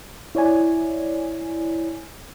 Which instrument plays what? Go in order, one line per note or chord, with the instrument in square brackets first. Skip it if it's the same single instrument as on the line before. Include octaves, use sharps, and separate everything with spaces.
[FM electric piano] E4 C#5 D5 G#5